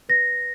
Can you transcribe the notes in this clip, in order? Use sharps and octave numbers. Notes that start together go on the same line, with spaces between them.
B4 A#6